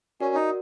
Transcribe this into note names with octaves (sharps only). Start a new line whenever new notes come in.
C#4 F#4 A#4 D5
D#4